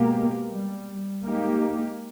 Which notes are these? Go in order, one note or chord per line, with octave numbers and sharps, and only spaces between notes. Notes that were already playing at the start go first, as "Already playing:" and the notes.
Already playing: B2 G#3 A#3 B3 G4
G3
G#3 A#3 D#4 G4